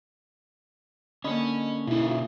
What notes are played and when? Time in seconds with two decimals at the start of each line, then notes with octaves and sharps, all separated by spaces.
1.24 D3 A#3 C#4 C#5 D#5 B5 D#6
1.87 B2 B3 C#4 D#4 E4
2.03 F4 E5